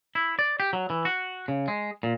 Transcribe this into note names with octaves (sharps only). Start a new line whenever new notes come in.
E4
D5
G4
F#3
E3
F#4
C#3
G#3
A#2